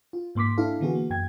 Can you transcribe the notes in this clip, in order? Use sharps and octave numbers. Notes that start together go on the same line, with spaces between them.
F4
G#2 A#3 C6 D6 B6
D4 E4 A4 F5
D3 E3 B3 F#4 G#4
A#3
F#2 G5 G#6